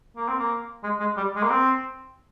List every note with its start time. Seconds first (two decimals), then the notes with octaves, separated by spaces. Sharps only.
0.17 A#3
0.28 C4
0.39 A#3
0.83 G#3
1.00 G#3
1.17 G3
1.36 G#3
1.43 A#3
1.50 C4